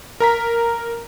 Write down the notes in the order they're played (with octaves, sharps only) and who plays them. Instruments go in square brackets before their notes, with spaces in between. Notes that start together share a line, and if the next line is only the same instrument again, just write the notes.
[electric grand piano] A#4 A#5 B6